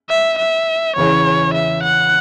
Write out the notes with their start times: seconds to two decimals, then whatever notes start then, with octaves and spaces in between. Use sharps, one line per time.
0.09 E5
0.38 E5
0.96 E2 C#3 E3 C#4 C#5
1.54 E5
1.83 F#5